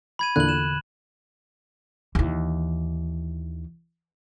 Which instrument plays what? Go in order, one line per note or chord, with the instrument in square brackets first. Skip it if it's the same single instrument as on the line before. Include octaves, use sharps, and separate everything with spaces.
[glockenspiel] B5 G#6 D#7
[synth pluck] E2 A#2 D3 [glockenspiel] F#6 F#7
[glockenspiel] E7
[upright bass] D#2 E3